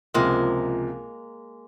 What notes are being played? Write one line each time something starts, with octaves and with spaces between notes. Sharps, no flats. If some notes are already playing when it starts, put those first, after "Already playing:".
C#2 C3 F3 G#3 A#3